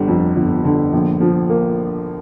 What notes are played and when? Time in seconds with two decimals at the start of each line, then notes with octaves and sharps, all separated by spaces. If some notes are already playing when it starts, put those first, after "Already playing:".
Already playing: G1 D3 G3
0.08 F2
0.36 G1
0.65 D3
0.93 A#1
1.21 F3
1.49 A#3